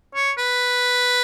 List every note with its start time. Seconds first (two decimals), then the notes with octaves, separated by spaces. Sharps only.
0.15 C#5
0.38 B4